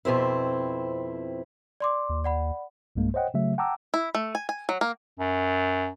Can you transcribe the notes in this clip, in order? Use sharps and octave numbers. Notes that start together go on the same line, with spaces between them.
F2 B2 C4 E4
D5 C6 D6
D#2
D5 F#5 B5
B1 G2 G#3 A#3
C5 C#5 D#5 F#5 G5
C#3 F#3 A3 E5
F#5 G5 A5 A#5 D6 E6
E4
A3
G#5
G#5
F#3
A#3
F#2